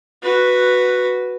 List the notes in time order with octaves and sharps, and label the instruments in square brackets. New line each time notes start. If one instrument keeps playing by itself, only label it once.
[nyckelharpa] F#4 B4